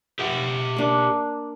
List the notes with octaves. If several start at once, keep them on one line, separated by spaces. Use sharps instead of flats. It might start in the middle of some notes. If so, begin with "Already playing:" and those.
G4 E5 F#5
A#3 D4